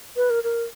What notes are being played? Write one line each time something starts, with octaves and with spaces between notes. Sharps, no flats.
B4
A#4
A#4